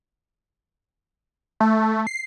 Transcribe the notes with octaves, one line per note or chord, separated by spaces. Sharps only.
A3
C7